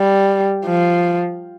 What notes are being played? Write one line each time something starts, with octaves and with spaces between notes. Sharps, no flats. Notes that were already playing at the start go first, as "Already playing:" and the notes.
Already playing: G3
F3